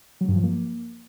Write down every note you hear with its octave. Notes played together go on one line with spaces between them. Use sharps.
F#3
G2
F3
A#3